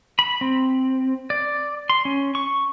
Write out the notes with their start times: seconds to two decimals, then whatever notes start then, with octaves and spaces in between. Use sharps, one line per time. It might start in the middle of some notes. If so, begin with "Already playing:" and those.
0.19 B5
0.41 C4
1.30 D5
1.90 C6
2.05 C#4
2.35 C#6